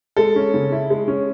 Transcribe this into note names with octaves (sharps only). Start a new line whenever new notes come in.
G#3 A4
C#4
C#3
E4
G#3
C#4